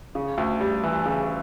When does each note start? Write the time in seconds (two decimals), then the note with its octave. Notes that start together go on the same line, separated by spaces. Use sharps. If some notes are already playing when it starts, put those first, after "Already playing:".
0.15 C#3
0.38 D2
0.60 G3
0.83 E3
1.06 C#3